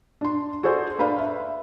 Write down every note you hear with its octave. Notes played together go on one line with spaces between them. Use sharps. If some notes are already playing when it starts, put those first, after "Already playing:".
D4 C6
F#4 G#4 A4 C5 D5 C6
D4 B4 D5 F5 B5
E5